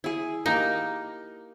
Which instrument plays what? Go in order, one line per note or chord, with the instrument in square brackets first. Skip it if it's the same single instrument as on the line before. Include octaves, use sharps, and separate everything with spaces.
[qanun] E4 G#4
[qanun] A#3 G4 [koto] D#4